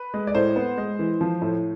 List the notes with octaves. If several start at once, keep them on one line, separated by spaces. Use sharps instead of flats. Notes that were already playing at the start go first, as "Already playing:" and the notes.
Already playing: B4
G#3
D5
A2 C5
B3
G#3
E3
F3
A2